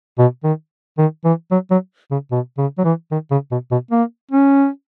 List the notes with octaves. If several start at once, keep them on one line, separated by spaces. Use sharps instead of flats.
B2
D#3
D#3
E3
F#3
F#3
C#3
B2
C#3
F#3
E3
D#3
C#3
B2
B2
A#3
C#4